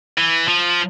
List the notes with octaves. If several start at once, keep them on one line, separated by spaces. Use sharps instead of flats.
E3
F3